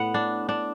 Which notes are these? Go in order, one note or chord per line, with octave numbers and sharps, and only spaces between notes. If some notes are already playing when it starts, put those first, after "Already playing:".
Already playing: A2 B3 F#5
D4
D4